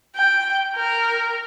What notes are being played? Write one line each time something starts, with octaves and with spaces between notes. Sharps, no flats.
G5
A#4